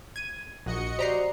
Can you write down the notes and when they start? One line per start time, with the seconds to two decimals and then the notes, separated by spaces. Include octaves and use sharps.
0.16 G#6 D#7
0.66 A#1 F#4 D#5 C#7
0.99 G4 C5 D5 A#5 C7